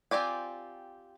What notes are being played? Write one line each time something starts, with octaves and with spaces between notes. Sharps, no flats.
C4 F4 G4 D5 G#5